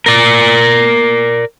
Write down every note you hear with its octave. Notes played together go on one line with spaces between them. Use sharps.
A#4 D5